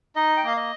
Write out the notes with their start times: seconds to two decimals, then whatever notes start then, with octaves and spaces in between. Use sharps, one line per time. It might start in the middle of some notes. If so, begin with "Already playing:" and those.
0.16 D#4 D#5
0.37 G5
0.43 A#3 F5
0.57 D#5